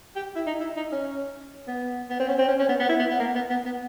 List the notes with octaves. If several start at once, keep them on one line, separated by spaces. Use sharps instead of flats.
G4
E4
D#4
E4
D#4
C#4
B3
B3
C4
C#4
C4
C#4
C#4
B3
B3
E4
B3
B3
A#3
B3
B3
B3